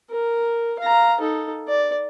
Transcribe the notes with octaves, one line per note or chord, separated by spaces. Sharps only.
A#4
F5 A#5
D#4 A4
D5